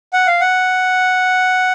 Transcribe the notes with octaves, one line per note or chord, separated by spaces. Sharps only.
F#5
F5
F#5